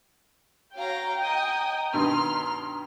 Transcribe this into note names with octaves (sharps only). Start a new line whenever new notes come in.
F#4 C#5 F5 G5 A#5
D#5 G#5 A#5 D#6
G2 B2 D#3 C6 F6